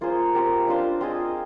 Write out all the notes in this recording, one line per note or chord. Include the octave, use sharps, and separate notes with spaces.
A#3 F4 G#4 C5
C4 G4 A#4
D4 F4 C5 F5
C4 F4 G#4 D#5